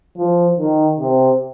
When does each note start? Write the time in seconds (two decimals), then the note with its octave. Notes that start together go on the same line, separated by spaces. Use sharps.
0.18 F3
0.58 D#3
1.00 C3